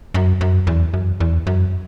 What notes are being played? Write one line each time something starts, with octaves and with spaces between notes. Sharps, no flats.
F#2
F#2
E2
F#2
E2
F#2